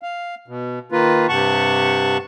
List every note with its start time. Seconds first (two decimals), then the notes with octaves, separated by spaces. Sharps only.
0.02 F5
0.48 B2
0.92 D#3 A#3 F4 B4
1.29 G2 C3 F#5 A5 C#6